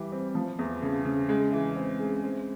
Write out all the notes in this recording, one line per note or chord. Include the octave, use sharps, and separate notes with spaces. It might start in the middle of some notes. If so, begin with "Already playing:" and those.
Already playing: E3 G3 G4
C4
F3
E2
C#3
C#3
G#3
E3
C4
G#3
C4